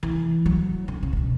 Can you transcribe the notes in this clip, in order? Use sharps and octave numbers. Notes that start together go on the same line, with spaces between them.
E3
F#3
D3
C#3
C#3
B2